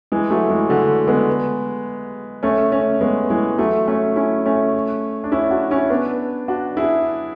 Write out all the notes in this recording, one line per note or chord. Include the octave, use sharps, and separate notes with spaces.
E3 G#3
F#3 A3
E3 G#3
D3 F#3
G#3 B3
A3 C#4
A3 C#4
G#3 B3
E3 G#3
F#3 A3
A3 C#4
C#4 E4
A3 C#4
D4
C#4 E4
D4 F#4
C#4 E4
B3 D4
D4 F#4
E4 G#4